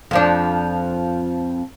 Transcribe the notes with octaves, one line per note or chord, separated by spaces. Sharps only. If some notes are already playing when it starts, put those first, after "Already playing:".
F2 F3 D4